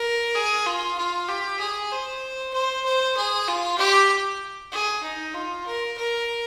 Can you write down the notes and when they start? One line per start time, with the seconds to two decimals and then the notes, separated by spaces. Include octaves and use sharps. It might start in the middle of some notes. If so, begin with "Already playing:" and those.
Already playing: A#4
0.35 G#4
0.66 F4
0.97 F4
1.28 G4
1.60 G#4
1.91 C5
2.53 C5
2.85 C5
3.16 G#4
3.48 F4
3.78 G4
4.72 G#4
5.03 D#4
5.34 F4
5.66 A#4
5.97 A#4